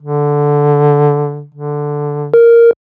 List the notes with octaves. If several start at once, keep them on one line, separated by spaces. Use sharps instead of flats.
D3
D3
A#4